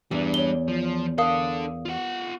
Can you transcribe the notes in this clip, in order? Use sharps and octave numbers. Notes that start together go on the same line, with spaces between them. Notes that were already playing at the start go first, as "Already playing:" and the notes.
E2 G3 D4
C#5 G7
F3
D4 A4 A#4 F5 D#6
F4 F#5